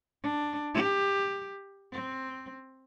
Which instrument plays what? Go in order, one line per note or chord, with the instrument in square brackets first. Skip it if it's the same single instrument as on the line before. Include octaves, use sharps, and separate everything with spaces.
[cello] D4
G4
C4